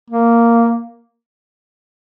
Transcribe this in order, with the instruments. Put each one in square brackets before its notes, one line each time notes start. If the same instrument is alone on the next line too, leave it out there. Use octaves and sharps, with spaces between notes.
[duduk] A#3